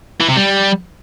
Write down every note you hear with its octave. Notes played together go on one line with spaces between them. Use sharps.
E3
C3
G3